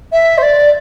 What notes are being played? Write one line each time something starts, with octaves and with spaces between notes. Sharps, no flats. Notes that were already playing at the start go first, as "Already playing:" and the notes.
E5
C5
D5